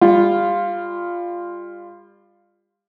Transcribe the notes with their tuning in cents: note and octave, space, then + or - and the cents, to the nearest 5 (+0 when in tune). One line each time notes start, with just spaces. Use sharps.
G3 +30 F4 +0